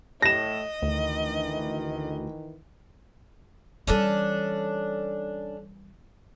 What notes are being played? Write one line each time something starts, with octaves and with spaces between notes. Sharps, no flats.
A2 D#5 A#6 E7
D2 D#3 E3
E3 G3 C#4 D4 A4